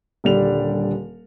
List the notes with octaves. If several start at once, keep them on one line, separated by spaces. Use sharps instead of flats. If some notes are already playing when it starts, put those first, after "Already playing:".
D#1 D3 G3 D4 F7